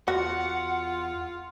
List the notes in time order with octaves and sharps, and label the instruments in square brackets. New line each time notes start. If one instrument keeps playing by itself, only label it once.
[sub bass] E2 [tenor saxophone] F4 [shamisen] F#4 [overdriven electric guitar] F#5